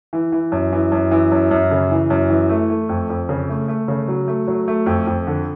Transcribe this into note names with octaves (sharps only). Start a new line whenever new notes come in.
E3
E3
F#2
E3
F#2
E3
F#2
F#2
C#3
E3
F#2
E3
A3
A3
F2
F2
C#3
A3
A3
C#3
F#3
A3
F#3
A3
F2
F2
D3